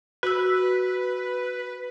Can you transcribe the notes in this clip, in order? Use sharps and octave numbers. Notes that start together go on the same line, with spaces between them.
F#4 B4 E6